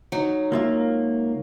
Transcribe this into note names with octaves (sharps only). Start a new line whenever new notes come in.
F#3 D#4
C#2 A#3 F4 E5